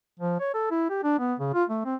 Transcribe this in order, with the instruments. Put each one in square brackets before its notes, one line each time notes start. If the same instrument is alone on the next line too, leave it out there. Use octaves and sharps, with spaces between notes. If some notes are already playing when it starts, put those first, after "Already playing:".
[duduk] F3
C#5
A4
E4
G4
D4
B3
C#3
F4
A3
C4